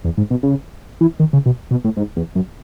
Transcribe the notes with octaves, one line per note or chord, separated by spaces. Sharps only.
E2
G#2
B2
C#3
E3
D#3
C#3
B2
B2
A2
G#2
E2
F#2